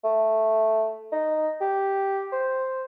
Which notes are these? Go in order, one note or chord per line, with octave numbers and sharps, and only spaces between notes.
A3
D#4
G4
C5